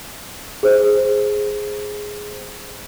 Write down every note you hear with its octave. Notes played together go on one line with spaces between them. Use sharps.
G#4 C5